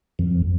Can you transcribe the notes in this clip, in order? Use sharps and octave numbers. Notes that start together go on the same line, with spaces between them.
F2